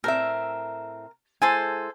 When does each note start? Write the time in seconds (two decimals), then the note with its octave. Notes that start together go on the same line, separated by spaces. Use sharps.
0.04 A2 C4 A#4 E5
1.42 G#3 E4 A4 C5 G#5